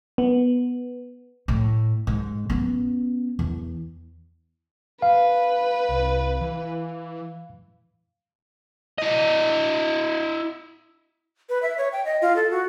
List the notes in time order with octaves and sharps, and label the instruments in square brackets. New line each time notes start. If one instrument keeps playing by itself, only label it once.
[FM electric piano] B3
[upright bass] A2
G#2
B3 C#4
E2
[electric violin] B4 [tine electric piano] F5
[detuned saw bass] C2
E3
[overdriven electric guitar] E4 D#5
[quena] B4
E5
C#5
G5
D#5
F4
A4
F#4